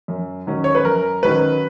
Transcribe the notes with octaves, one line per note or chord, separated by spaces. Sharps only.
F#2
D#3 F#3 C#4
C#5
B4
F#2 A#4
D#3 F#3 C#4 B4